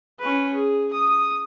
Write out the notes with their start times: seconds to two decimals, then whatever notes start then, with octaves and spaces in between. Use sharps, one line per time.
0.19 C#4 B4
0.54 G#4
0.93 D#6